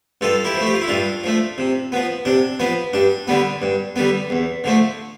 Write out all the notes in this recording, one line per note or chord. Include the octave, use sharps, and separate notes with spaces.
G2 F4 A4
E4 G4
F3
A3
G4
F4
E4
G2 D4 F4
F3 A3
C3
F3 B3
C3 D4
F3 B3
G2 D4
D3 G3 B3
G2
D3 G3 B3
E2
D3 F3 A3